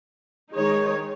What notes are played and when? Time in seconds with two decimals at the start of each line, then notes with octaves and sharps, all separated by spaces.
0.53 D#3 G#3 D#4 G#4 C#5